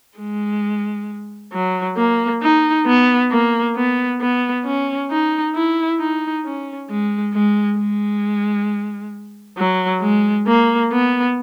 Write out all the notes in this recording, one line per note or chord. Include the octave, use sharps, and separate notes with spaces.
G#3
F#3
A#3
D#4
B3
A#3
B3
B3
C#4
D#4
E4
D#4
C#4
G#3
G#3
G#3
F#3
G#3
A#3
B3